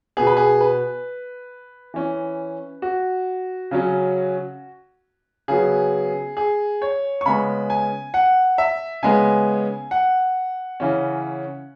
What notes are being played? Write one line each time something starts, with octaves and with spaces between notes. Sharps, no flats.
B2 B3 G#4
B4
G#4
B4
E3 C#4
F#4
C#3 F#3 C#4
C#3 F#3 B3 G#4
G#4
C#5
C#6
C#3 G#3 B3 B5
G#5
F#5
E5
C#3 G#3 B3 G#5
F#5
C#3 E3 C#4